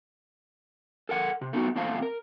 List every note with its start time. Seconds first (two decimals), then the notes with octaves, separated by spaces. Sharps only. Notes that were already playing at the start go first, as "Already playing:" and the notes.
1.09 A4 A#4 F#5
1.41 C3
1.53 A3 B3 D#4 F#4
1.76 E2 A#2 A3 C4 F5 A5
2.02 A#4